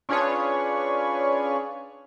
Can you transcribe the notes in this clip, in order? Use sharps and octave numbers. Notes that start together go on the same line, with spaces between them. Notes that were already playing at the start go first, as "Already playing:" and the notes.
C#4 D4 F4 G#4 B4 C#5